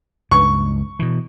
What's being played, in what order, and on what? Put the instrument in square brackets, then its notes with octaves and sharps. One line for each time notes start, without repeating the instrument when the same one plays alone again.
[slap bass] C#2 G2 [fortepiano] C#6
[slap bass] B2 E3